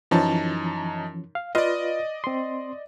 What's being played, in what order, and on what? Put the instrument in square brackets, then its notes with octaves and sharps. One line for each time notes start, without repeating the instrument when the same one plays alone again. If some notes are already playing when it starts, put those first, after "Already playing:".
[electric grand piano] F#2 D#4 A5 [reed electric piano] E3 F3 C#4
[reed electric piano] F5
[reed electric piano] F4 B4 F5 [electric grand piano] D5 D#5
[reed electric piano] C4 C6